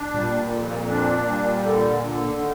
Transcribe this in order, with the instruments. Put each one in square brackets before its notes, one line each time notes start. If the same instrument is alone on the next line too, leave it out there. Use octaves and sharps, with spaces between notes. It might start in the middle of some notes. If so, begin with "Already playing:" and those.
Already playing: [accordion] D4
[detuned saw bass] A#2 [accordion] G3
[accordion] F2
D4
G3
D3
D3
D#3